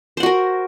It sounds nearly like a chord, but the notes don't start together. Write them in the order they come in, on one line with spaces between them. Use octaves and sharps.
C5 F#5 F#4 A#4